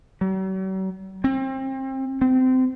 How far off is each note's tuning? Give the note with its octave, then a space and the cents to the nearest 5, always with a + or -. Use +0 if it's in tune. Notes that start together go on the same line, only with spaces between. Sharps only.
F#3 +45
C4 +30
C4 -25